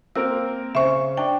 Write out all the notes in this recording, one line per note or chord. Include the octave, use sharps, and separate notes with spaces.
A#3 C4 A#4 E6
C#3 C5 E5 C#6
D4 G5